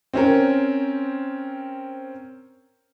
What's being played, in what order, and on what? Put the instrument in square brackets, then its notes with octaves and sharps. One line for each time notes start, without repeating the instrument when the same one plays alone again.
[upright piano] C4 C#4 A#4